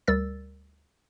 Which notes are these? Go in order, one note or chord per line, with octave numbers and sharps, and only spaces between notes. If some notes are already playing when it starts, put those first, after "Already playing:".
D2 G3 A#4 E6 A6